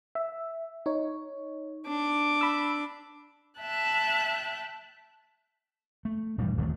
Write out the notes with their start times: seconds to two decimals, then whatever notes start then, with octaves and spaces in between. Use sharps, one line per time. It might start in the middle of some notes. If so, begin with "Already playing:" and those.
0.15 E5
0.86 D#4 C#5
1.86 D4 D6
2.41 B5 E6
3.59 E5 G5 A5 F#6
6.05 A3
6.38 D#1 G2 E3 G3
6.57 D1 A1 D#3 A3